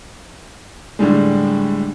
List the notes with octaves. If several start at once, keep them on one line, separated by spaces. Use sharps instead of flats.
A2 D3 G3 G#3